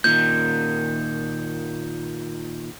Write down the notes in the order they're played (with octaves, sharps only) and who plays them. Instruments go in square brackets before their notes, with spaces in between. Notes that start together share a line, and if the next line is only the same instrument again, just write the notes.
[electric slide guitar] A#2 D#3 [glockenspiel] G6